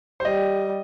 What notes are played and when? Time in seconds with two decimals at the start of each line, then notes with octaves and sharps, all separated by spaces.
0.20 C5
0.24 G3 D#5